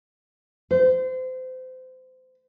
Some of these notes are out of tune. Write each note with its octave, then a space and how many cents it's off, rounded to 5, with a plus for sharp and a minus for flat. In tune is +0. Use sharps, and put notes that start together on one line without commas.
C5 -30